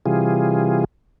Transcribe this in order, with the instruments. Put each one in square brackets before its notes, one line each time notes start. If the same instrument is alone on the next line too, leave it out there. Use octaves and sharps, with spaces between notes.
[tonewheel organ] C3 E3 G3 F4 G#4